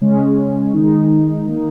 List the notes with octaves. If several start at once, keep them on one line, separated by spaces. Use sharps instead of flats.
C#3 G#3 C#4
D#3 G#3 D#4
D#3 A#3 D#4